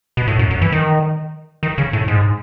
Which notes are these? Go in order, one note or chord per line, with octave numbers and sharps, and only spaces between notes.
B2
A2
F#2
F#2
E3
D#3
D#3
C#3
A2
G#2